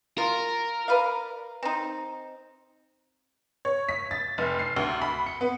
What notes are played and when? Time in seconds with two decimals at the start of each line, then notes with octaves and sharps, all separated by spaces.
0.18 F4 A#4
0.88 B4 D5 F5
1.63 C4 D#4
3.65 C#5
3.89 B6
4.11 A6
4.38 F1
4.59 C7
4.76 D2
5.02 B5
5.26 C#7
5.41 B3